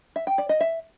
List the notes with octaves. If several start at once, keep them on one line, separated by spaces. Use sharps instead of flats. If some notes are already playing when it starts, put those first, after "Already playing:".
E5
G5
D5
D#5
E5